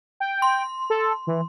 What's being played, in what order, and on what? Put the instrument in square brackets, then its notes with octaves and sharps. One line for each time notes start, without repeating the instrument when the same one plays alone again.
[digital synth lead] G5
[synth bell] C6
[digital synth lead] A4
E3